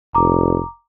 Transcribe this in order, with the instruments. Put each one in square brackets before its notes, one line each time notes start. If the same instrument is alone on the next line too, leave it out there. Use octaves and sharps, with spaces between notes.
[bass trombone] F1 [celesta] A#5 D6